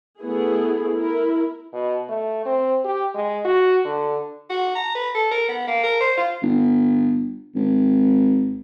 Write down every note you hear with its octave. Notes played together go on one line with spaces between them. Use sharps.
A3 B3 E4 G#4
E4 A#4
B2
A3
C4
G4
G#3
F#4
D3
F#4
A#5
B4
A4
A#4
B3
A#3
A#4
C5
F4
G1
G#1